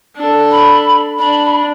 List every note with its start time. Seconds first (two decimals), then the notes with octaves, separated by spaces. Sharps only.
0.17 D4 A4
0.51 B5
1.19 D4 B5